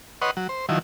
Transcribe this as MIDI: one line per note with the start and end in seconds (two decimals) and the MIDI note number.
0.22 0.31 71
0.22 0.31 73
0.22 0.31 75
0.22 0.31 78
0.22 0.31 84
0.37 0.48 54
0.49 0.66 72
0.69 0.79 51
0.69 0.79 53
0.69 0.79 54
0.69 0.79 64